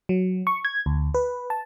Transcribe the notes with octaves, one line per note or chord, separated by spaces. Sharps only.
F#3
C#6
G#6
D2
B4
A5